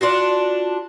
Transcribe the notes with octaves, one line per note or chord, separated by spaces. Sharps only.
D4 F4 F#4